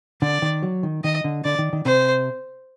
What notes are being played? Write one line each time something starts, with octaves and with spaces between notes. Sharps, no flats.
D3 D5
D#3
F#3
D#3
D#3 D#5
D3
D3 D5
D#3
D#3
C3 C5